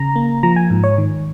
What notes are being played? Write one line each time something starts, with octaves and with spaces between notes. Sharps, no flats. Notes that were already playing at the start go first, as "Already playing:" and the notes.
Already playing: C#3 A#5
A#3
F3 A#5
G#5
G#2
C#5
D#3